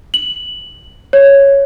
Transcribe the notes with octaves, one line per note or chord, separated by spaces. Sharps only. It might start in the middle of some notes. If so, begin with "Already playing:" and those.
F#7
C#5